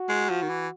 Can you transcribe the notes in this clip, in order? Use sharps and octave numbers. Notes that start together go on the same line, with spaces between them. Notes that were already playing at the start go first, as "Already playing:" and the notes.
Already playing: F#4
G#3
F3
D#3
E3